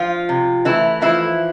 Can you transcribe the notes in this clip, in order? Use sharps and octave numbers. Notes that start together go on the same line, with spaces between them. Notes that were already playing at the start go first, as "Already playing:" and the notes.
Already playing: F3 F4
C3
E3 A3 E4
E3 F3 E4